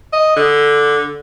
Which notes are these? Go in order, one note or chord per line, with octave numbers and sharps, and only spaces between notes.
D#5
D3